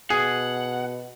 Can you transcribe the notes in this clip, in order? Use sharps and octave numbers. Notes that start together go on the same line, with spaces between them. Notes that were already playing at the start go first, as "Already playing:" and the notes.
B2 G#4 F#5